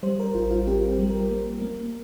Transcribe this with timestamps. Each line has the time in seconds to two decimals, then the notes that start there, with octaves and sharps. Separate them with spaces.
0.03 G3 C5
0.20 A#4
0.35 A1 F4
0.51 F4
0.67 C4 G4
0.88 G4
0.99 G3
1.10 A#4
1.31 A#3
1.62 A#3